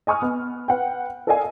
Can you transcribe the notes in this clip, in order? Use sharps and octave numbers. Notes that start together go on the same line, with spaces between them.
D#5 G#5 C#6 D#6 F6
B3
B4 F#5 G5
A4 A#4 D5 D#5 F5 G#5